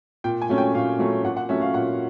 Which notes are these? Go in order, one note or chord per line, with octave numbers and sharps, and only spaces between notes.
A#2 G5
G#5
F#3 A3 C#4
G5
A#2 F5
F#3 A3 C#4
A#2 F#5
F#5
F#3 A3 C#4 E5
F5
A#2 F#5